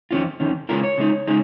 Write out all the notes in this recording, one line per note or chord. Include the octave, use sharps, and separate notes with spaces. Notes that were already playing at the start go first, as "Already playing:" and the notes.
F2 D#3 C#4 F4
F2 D#3 C#4
C#3 G#3 C#4 F4 A#4
C#5
C#3 G#3 D#4
C#3 G#3 D#4